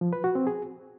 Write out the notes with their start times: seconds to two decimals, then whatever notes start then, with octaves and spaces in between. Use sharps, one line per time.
0.01 F3
0.13 B4
0.24 F#4
0.35 C4
0.47 G#4